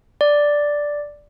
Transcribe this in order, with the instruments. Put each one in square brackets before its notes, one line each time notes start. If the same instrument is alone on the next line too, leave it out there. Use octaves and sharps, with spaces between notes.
[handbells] D5